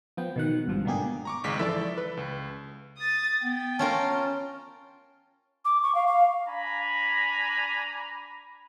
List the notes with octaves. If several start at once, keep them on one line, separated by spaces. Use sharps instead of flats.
F3 B3 G5
B2 D#3 F#5
G#1 G2 F3
B2 D3 A#3 G4 G#4
A#5 C#6 D6
G#1 C#2 G#3 B6
E3 F3 A4 D5 E5
B4
C#2
D#6 A6
B3 G5
C#4 F4 A#4 A5
D6
C#6
F5
F5
D4 G#5 A#5 B5